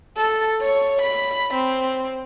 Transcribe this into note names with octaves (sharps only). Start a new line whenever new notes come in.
A4
C#5
B5
C4